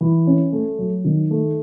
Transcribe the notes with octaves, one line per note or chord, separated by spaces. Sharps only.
E3
C#4
A3
F#3
D#3
A3